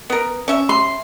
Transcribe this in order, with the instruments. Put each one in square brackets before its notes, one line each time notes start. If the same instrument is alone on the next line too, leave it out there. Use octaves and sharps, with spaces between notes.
[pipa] B3 A#4
C#4 E5
[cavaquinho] C6